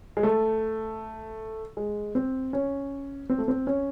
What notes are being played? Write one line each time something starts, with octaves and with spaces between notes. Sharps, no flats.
G#3
A3
G#3
C4
C#4
C4
A3
C4
C#4